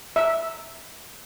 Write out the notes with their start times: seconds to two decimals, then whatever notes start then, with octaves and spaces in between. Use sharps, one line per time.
0.16 E5